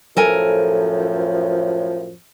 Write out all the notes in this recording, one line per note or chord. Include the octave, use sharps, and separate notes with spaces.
F#2 A2 F3 A4 A#4 G#5